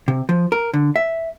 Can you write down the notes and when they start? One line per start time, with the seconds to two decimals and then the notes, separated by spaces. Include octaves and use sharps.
0.08 C3
0.29 F3
0.52 A#4
0.73 D3
0.96 E5